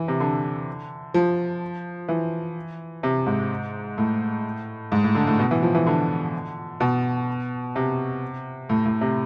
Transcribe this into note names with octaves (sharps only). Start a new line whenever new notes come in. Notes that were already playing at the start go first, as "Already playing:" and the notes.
Already playing: E3
C3
D3
F3
E3
C3
G#2
A2
G#2
A2
D3
A2
B2
E3
F3
E3
D3
B2
C3
A2
A2
C3